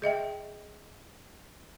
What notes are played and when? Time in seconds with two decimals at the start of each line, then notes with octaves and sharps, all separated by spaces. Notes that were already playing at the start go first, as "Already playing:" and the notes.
0.02 G#4 D#5 E5 G5